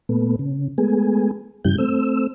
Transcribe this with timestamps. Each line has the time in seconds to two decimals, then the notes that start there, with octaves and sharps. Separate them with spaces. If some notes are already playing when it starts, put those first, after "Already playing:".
0.09 A#2 A3 B3
0.39 C#3
0.78 G#3 A3 B3 G#4
1.65 G2 C#3 E3 G3 G6
1.78 A3 C4 E6